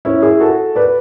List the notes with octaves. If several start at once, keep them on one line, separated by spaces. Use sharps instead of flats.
C#4 E4
E4 G#4
F#4 A4
B4 D5